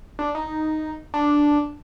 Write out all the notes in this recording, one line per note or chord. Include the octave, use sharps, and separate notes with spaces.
D4
D#4
D4